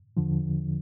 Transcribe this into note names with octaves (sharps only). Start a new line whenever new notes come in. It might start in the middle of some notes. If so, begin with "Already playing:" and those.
E2 D3 F3